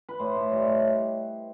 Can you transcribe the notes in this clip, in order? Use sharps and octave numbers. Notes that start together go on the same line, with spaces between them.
B4
A2 C5
A2 E5
G3 D#5
A2